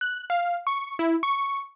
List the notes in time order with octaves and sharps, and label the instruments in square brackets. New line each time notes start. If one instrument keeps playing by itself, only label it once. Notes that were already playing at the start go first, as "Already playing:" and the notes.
[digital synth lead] F#6
F5
C#6
E4
C#6